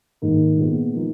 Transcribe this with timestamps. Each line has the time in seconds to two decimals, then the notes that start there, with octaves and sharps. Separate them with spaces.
0.22 G#2 D#3 A#3 D#4 A#4
0.57 A#2 G#3 B3
0.94 F3 A#3 D#4